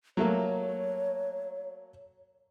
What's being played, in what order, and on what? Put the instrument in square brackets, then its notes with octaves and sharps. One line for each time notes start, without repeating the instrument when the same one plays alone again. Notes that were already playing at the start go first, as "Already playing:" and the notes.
[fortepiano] F#3 A3 A#3 [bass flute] C#5